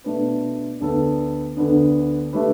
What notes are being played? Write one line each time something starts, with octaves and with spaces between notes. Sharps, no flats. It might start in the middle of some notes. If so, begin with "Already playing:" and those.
B2 A3 D4 B4
D2 D3 B3 D4 A4
D2 D3 B3 D4
D3 A3 G4 B4